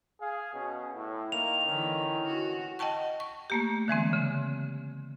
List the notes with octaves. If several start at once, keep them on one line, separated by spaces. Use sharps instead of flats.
G#4 F5
B2 C#4
A2 E4
D#3 A#3 F7
D3 E3 C#4
F#4
D#5 F#5 G5 A5 C#6
C#6
A3 A#3 G4
D3 E3 G#3 C4
C#3